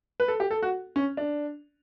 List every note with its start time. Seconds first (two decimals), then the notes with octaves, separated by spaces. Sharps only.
0.20 B4
0.28 A4
0.40 G4
0.51 A4
0.63 F#4
0.96 C#4
1.17 D4